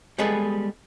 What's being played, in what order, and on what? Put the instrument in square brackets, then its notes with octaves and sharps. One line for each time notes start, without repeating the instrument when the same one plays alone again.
[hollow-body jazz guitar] G3 G#3 B3 G#4 A4 B4